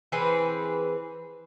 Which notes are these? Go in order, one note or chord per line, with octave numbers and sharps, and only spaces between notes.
E3 C4 G#4 B4